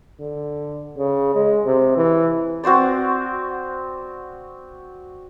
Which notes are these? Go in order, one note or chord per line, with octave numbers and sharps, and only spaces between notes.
D3
C#3
G#3
C3
E3
C4 F#4 C5 D5